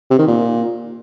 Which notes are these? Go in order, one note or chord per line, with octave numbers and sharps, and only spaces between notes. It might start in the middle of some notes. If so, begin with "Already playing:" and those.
C3
D#3
A#2